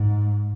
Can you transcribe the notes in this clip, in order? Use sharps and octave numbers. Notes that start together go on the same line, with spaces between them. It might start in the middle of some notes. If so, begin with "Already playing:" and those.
Already playing: G#2